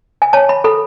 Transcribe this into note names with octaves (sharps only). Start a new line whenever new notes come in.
G#5
C#5 A5
B5
A4 B5